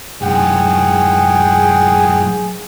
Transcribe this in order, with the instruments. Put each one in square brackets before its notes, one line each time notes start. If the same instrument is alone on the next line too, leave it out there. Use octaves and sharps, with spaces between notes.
[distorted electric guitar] F#2 A2 [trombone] G#4 [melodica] F#5 G5